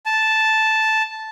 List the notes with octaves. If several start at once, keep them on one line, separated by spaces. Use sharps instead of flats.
A5